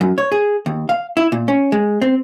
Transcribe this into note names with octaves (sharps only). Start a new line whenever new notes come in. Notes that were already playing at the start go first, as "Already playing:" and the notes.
F#2
C#5
G#4
D#2
F5
E4
A#2
C#4
G#3
C4